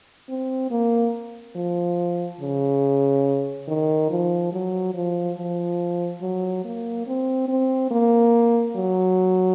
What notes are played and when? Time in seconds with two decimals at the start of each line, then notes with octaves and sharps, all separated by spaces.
0.29 C4
0.71 A#3
1.56 F3
2.41 C#3
3.68 D#3
4.10 F3
4.52 F#3
4.94 F3
5.37 F3
6.22 F#3
6.65 A#3
7.07 C4
7.48 C4
7.91 A#3
8.76 F#3